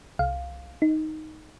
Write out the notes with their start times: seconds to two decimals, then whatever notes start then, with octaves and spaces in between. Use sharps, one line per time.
0.19 C2 F5
0.82 D#4